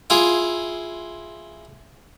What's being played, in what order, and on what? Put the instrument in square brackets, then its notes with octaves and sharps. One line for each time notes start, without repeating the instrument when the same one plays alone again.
[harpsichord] E4 F4 G#4